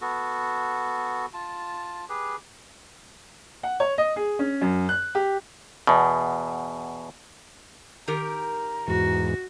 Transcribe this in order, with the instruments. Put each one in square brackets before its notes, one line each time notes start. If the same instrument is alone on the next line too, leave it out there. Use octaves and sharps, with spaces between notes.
[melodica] B3 F#4 A4
F4 A5
G4 G#4 B4
[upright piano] F#5
C#5
D#5
G#4
C#4
F#2
F#6
G4
[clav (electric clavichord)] E2 B2
[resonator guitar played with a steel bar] D#3 G4 A#4 [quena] A#5
[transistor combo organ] E2 G#2 [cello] F#4